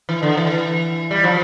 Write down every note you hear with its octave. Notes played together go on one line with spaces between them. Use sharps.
E3
D3
E3
G3
F3